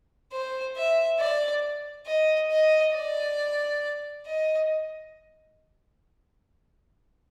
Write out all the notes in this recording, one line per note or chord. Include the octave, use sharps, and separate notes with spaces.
C5
E5
D5
D#5
D#5
D5
D#5